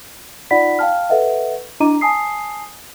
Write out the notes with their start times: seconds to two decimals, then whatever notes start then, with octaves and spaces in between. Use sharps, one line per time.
0.51 D#4 F4 D5 F#5 B5 B6
0.79 F5 G5 A5 F6
1.10 A4 B4 D#5 E5 F#5
1.80 D4 E4 D#5 A#5 D6 D#7
2.01 G#5 A5 D#6 C7